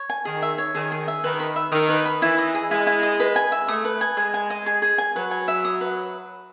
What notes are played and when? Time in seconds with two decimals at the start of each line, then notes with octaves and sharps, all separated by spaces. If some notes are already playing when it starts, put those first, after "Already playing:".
Already playing: C#5
0.10 G#5
0.25 D#3 G#4
0.42 E5
0.58 C#5
0.75 D#3 G#4
0.92 G#4
1.08 E5
1.24 D#3 B4
1.40 B5
1.56 E5
1.72 D#3 D#6
1.89 B4
2.06 B5
2.22 E3 E4
2.38 D#5
2.55 G#4
2.71 G#3 E4
2.87 E4
3.03 D#5
3.20 B4
3.36 G#5
3.52 E5
3.68 A3 D#6
3.84 B4
4.01 G#5
4.17 G#3 G#4
4.34 G#5
4.50 D#5
4.66 G#4
4.82 G#4
4.98 G#5
5.15 F#3 B4
5.31 G#5
5.48 E5
5.65 D#6
5.81 B4